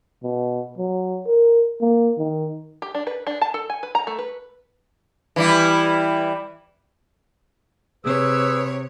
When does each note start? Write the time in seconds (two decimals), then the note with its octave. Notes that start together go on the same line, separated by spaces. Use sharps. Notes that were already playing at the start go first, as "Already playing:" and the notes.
0.24 B2
0.78 F#3
1.27 A#4
1.81 A#3
2.19 D#3
2.82 G4
2.95 D4
3.07 B4
3.27 D4
3.42 A5
3.54 A4
3.70 G#5
3.83 B4
3.95 A#5
4.07 A3
4.19 B4
5.36 E3 G3 E4
8.05 C3 G#4 B4 C#5 E6